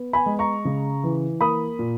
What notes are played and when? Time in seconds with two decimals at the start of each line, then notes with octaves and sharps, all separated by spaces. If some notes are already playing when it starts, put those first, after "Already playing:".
Already playing: B3
0.13 G#5 B5
0.26 G#3
0.39 A#5 C#6
0.65 C#3
1.03 E3
1.41 A#3 B5 D#6
1.79 A#2